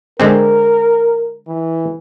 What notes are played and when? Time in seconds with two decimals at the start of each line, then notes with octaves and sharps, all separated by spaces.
0.20 D3 G#3 C4 A#4
1.48 E3